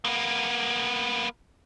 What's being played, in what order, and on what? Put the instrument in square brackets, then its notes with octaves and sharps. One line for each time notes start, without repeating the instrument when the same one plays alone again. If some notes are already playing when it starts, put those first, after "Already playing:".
[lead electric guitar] A#3 B3